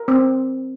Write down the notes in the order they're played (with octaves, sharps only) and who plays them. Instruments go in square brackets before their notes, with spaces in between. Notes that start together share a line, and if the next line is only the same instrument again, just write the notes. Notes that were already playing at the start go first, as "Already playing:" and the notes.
Already playing: [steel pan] A#4
C4